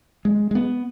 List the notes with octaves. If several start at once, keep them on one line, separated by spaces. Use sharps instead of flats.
G#3
G#3
B3